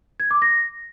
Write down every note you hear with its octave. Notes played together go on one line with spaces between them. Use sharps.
G#6
D6
A#6